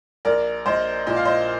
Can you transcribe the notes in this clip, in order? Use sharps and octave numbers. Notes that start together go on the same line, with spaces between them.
A#1 A#4 D5
A#1 C5 D#5
A#2 D#5
F5
C5 D#5